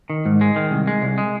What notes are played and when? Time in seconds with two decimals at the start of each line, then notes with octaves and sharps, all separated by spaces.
0.10 D#3
0.26 G#2
0.41 G#3
0.56 D#3
0.71 C2
0.87 G#3
1.02 C2
1.18 G#3